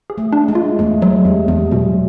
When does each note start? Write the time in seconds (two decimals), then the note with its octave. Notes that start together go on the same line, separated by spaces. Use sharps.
0.10 G#4
0.18 A3
0.33 D4
0.48 G#3
0.55 F4
0.79 E2 A3
1.02 F#3 G#3
1.25 E2 G3
1.48 E2 G3
1.71 B2 F#3